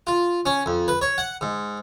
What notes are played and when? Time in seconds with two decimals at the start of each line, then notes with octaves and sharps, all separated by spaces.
0.07 F4
0.46 C#4
0.66 F2
0.88 B4
1.01 C#5
1.18 F#5
1.41 G#2